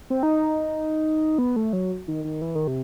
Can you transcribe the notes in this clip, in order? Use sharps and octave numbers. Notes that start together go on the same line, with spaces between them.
C4
D#4
B3
A3
F#3
D#3
D#3
E3
D#3
C3